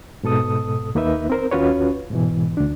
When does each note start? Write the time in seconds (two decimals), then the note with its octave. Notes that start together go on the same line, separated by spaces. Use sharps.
0.23 G#2 B2 A4 D#6
0.95 D#2 A#3 D#4 B4 E5
1.30 C4 A#4 C5
1.51 D#2 C#4 F4 F#4 B4 C#5
2.10 G#2 B2 E3
2.57 D2 D4